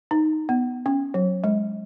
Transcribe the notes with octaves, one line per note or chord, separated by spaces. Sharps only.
D#4
B3
C#4
F#3
G#3